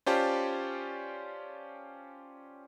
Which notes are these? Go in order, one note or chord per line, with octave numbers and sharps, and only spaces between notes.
C#4 F4 G4 C5 D5 A5